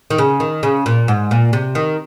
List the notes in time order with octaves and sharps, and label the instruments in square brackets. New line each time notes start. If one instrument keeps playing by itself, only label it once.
[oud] D#3
C#3
D#3
C#3
A#2
G#2
A#2
C3
D#3